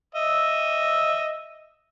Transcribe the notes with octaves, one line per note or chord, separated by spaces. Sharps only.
D#5 E5